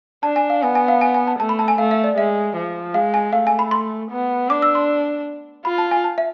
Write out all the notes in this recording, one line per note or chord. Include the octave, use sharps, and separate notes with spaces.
D4 A5
G#5
F5
B3 G#5
G#5
F5
G#5
G#5
A5
A3 A5
B5
A5
G#5
A3 F5
E5
D5
G#3 E5
F3
G#3 F5
G#5
A3 F5
G#5
B5
C6
B3
D4 D6
E6
C6
F4 B5
A5
G#5
A5
E5